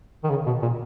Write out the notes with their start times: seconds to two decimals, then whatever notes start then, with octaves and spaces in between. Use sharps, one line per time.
0.24 D#3
0.30 C#3
0.46 B2
0.62 A#2